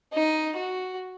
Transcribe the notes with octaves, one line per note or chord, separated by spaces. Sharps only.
D#4
F#4